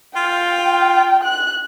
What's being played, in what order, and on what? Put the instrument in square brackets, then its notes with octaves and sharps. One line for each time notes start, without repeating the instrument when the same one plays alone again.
[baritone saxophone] F4 [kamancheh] G5
[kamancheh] F#6